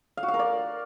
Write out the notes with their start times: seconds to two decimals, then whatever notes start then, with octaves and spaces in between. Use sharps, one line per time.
0.17 F5
0.23 F#4
0.28 F5
0.34 A#4
0.39 D5